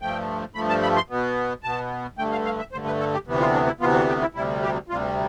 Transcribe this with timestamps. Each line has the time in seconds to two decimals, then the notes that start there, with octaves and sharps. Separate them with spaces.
0.01 G2 F3 A3 G5
0.55 G2 F3 A3 B5
0.69 A5
0.83 B5
0.97 C6
1.10 B2 B3
1.63 B2 B3 A5
2.18 G2 D3 A3 G5
2.31 F5
2.45 F5
2.59 E5
2.72 G2 D3 A3 C5
2.86 B4
3.00 A4
3.13 G4
3.27 D2 C3 E3 B3
3.40 F4
3.54 D4
3.66 E4
3.80 D2 C3 E3 B3 F4
4.08 G4
4.21 E4
4.35 D2 C3 G3 E4
4.62 G4
4.89 D2 C3 G3 F4